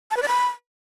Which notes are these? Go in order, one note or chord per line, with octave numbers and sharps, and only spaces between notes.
A5
B4
D5
B5